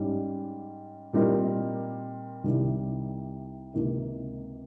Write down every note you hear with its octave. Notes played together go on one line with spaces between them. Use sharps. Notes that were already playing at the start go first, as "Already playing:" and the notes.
Already playing: G#2 G3 C#4
A#2 G3 C4 D#4 A#4
C2 C3 D#3 G3
C#2 C3 D#3 A#3 D#4